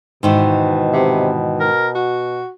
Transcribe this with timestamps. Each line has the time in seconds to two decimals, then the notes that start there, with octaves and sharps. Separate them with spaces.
0.23 G#2 B2 D#3 E3
0.93 C3
1.60 A#4
1.95 F#4